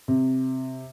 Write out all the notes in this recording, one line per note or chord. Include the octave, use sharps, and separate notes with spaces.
C3